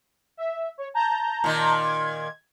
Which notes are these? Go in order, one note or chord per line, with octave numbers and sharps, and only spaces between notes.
E5
C#5
A5 A#5 G6
A#2 D#3
G#6